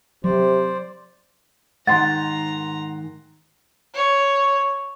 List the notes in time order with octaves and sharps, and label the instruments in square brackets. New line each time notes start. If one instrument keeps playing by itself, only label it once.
[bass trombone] C3 [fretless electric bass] F#3 [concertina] C5 D5
[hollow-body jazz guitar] G#2 D#3 [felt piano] F#5 C6 [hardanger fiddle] A#5 [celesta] A6
[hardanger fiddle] C#5